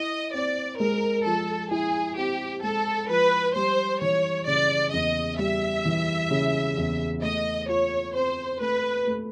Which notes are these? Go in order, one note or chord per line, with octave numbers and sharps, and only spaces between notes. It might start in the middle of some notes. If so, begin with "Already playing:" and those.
Already playing: E4 D#5
C4 D5
G#3 A#4
F3 A4
E4 G#4
C4 G4
G#3 A4
F3 B4
G3 C5
E3 C#5
C#3 D5
E2 D#5
G3 E5
E3
C#3
E2
A3 D#5
F4 C#5
C4 C5
A3 B4
A3